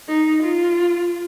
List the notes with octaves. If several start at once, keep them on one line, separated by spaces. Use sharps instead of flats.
D#4
F4